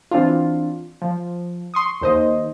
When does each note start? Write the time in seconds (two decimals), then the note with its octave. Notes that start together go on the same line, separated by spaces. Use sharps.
0.11 E3 C4 D4 F4
1.02 F3
1.74 C6 C#6 D#6
2.01 D#2 C5 D#5